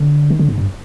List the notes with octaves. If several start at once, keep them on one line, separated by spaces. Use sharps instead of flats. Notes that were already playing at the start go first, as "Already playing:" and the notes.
Already playing: D3
D#3
D3
G#2
G2